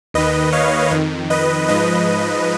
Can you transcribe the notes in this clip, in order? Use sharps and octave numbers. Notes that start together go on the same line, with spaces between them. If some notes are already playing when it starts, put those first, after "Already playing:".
D#2 D#3 B4 D#5
C#5 F5
F2 D#3
B4 D#5
G#2 F3 B4 D#5